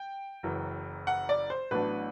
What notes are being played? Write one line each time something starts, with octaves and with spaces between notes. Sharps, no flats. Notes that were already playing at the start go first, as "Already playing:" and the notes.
Already playing: G5
F#1 F#2 E3
F#5
D5
C5
A1 A2 F#3 B3 D4 B4